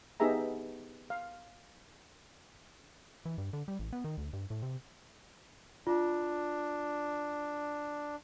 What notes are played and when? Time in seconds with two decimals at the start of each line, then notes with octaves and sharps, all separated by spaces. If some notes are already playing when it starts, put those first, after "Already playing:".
0.20 B3 D#4 G4 G#4 E5 A#5
1.10 F5
3.25 E3
3.38 G2
3.53 D3
3.68 G3
3.79 A1
3.93 B3
4.04 D#3
4.17 D2
4.33 G2
4.50 A2
4.62 C3
5.87 D4 F4